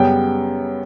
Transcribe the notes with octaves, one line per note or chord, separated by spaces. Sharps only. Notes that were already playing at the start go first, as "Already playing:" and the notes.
Already playing: F#2 C#3 G3 B3 G5